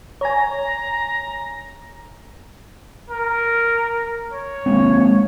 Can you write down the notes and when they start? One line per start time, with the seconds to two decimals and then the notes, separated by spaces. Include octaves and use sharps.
0.21 C#5 G#5 A#5
3.10 A#4
4.33 C#5
4.66 G#3 A#3 C4